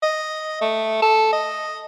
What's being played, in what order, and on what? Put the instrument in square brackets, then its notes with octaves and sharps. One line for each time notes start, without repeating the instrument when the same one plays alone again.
[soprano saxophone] D#5
A3
A4
D#5